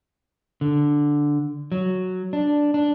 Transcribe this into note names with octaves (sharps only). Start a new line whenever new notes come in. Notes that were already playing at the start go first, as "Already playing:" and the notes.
D3
F#3
D4
D4